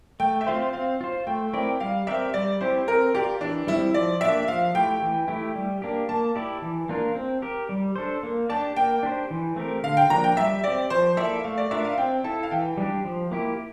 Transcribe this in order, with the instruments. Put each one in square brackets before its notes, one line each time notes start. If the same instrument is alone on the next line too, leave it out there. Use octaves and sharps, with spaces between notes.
[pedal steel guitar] A3 [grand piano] G5
[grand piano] E5
[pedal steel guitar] C4 F4 C5 [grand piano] F5
[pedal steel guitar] C4 [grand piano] F5
[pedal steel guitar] F4 C5
[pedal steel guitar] A3 [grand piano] G5
[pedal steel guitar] C4 E4 A#4 D5 [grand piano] G5
[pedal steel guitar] G3 [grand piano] F5
[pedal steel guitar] C4 G4 A#4 D5 [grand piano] E5
[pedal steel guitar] G3 [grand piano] D5
[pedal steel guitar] C4 E4 G4 [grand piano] C5
[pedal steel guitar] C4 [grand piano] A#4
[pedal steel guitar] F4 A#4 D5 [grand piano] G4
[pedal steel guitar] E3 [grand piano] D4
[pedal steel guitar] G3 C4 [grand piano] E4
[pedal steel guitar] F3 [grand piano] D5
[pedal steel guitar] A#3 D4 G4 D5 [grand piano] E5
[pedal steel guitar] F3 [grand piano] F5
[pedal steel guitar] A3 E4 G4 [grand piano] G5
[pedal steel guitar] E3
A3 E4 G4
G3
A#3 D4 G4
[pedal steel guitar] A#3 [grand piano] A5
[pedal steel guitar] E4 G4 D5
E3
A#3 D4 F4 A#4
C4
G4 A#4
G3
D4 A4 C5
A#3
[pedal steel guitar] D4 G4 D5 [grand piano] A5
[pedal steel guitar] A#3 [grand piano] G5
[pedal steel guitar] D4 G4 C5
E3
A3 C4 G4 A#4
[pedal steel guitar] D3 [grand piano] F5
[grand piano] G5
[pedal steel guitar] F3 A#3 D4 [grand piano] A#5
[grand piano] G5
[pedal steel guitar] G3 [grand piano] E5
[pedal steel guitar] C4 G4 [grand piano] D5
[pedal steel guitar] F3 [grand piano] C5
[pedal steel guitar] A#3 E4 A4 D5 [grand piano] E5
[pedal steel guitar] A3 [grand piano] F5
[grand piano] D5
[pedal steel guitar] D4 F4 A#4 D5 [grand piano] E5
[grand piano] F5
[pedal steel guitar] C4 [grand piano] G5
[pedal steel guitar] E4 A4 [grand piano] A5
[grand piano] F5
[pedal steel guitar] E3 [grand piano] G5
[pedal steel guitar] G3 D4 G4
F3
A#3 E4 G4